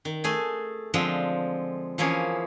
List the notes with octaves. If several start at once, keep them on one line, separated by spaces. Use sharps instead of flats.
D#3
A3 G#4 G#5
D3 F3 G#3 C4
E3 F3 A#3 C#4 G#4